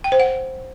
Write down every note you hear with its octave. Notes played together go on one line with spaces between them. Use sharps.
G5
C5
F#5